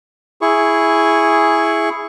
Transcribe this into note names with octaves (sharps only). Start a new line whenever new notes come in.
E4 G#4 C#6